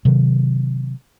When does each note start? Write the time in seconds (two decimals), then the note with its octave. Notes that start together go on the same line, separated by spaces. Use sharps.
0.05 C3 D#3 F#3